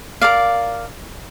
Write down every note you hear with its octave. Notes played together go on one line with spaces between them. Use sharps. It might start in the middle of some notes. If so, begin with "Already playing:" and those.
A#4 D5 F5